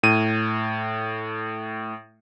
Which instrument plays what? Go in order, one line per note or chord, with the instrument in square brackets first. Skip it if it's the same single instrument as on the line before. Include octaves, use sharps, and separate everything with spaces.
[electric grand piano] A2 D#7